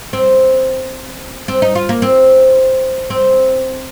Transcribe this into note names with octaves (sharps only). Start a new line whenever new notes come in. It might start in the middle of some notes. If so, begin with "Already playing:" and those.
C4
C4
D#4
F4
A#3
C4
C4